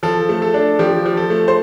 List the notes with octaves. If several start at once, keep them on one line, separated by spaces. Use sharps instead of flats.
F3 A4
A3
A4
D4
F3 G4
F3
A4
A3
C5